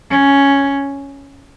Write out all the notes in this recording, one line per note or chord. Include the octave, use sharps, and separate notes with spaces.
C#4